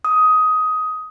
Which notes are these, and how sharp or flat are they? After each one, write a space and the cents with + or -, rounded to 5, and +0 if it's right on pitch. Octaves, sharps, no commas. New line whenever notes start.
D#6 +15